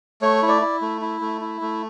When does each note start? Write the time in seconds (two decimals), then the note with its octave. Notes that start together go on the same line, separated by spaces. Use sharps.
0.22 A3 C#5
0.42 E4
0.48 D5
0.62 E4
0.82 A3
1.01 E4
1.21 A3
1.41 E4
1.61 A3